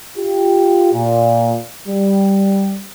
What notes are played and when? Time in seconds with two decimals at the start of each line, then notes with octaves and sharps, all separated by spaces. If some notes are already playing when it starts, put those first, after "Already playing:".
0.18 F4 G4
0.92 A#2
1.88 G3